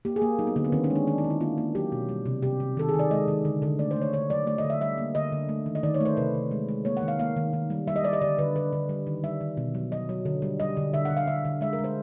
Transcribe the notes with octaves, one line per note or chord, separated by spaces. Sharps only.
A#3 G4
G#4
A#3
F#3 D#4
B3
D3 A#3
B3
D#3 C4
C#4
G#3
D4
D#3 D4
D#4
D#3
E4
A#3 F4
A#3
F#3 G4
B2
G3
C3
C3 G4
C3
D#3 A4
G#4
D#3
D5
G#3 D#5
D#3
D3
D3
A3 D5
C5
A3
C#5
D3 C#5
F#3 D5
A3 D5
D#5
D3
E5
G3 E5
A#3
D3 D#5
D3
A3
D#3
D#5
D#3 D5
C#5
A3 C5
C3 B4
C3
G#3
G#3
A#3 C#5
F#5
D#3
F5
A#3 F5
D#3
D#3
G3
G3 E5
D#5
G3 D5
D#5
D3 D5
D3 B4
D3 B4
D3
G3
D#3
G3 E5
D#3
B2
F#3
F#3 D#5
F#3
D3
G3
G3 D#5
D3
D3 E5
F#5
D3
F5
D3 E5
D3
G#3 E5
A#4
G#3
C5